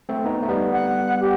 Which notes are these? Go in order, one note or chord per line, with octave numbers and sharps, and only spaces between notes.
A3 C4
B3 D#4
A3
G3 B3
F#5
G4